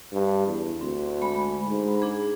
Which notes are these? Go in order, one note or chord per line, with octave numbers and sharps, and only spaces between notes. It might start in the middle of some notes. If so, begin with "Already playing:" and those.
G2
E2
D2 C4
G#3 B5
G#2
D4 G#4